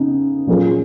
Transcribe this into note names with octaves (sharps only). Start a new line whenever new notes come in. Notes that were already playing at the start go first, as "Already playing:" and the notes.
Already playing: C#3 B3 D#4
A#2 F#3 C#4 F4 G#4